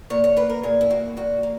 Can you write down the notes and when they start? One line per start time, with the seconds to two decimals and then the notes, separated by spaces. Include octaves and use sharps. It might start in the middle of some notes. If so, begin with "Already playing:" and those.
0.10 A#2 C#5
0.24 C#5
0.37 A#3 B4
0.50 A#4
0.63 A#2 G#4
0.81 E4
0.90 A#3 F#4
1.17 A#2 F#4
1.43 A#3